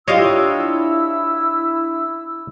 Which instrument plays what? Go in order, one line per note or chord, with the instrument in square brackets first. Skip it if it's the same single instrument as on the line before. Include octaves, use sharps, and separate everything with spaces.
[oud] D4 F4 G4 [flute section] E4 E6 [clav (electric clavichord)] C#5 D#5 F5